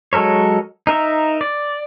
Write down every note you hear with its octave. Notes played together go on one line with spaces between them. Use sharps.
F#3 G#3 A4 A#4 C#5
D#4 A#4 E5
D5